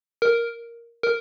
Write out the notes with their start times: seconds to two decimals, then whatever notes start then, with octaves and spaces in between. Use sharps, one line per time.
0.22 A#4
1.03 A#4